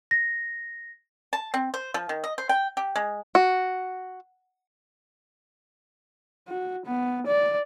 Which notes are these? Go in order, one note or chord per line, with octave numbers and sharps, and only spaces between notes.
A#6
A5
C4
C5
F3
D#3
D#5
C5
G5
G4
G#3
F#4
F#4
B3
D5